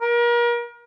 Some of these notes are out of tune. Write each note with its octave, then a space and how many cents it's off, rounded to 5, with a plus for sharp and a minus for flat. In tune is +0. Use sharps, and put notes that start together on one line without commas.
A#4 +35